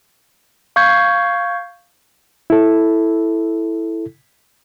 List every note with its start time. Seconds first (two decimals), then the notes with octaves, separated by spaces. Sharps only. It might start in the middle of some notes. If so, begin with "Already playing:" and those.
0.76 F5 C#6 G6 G#6
2.50 E4 A4